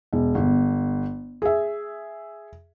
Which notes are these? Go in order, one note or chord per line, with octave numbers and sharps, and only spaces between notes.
E1
G1
G#4 E5